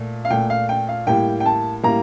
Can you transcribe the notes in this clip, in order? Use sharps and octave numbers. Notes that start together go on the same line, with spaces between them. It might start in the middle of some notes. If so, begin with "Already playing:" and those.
Already playing: A#2 A3
F5
A#2 A3 G5
F5
G5
F5
A2 G3 A#3 G5
G5
A5
A2 G3 A#3 A#5